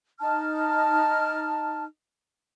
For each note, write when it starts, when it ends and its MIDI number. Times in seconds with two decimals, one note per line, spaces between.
0.20 1.84 63
0.20 1.84 81
0.20 1.84 89